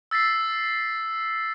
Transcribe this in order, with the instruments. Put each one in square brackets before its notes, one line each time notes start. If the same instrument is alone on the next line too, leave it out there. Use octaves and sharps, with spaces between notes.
[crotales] E6 A6 B6 C7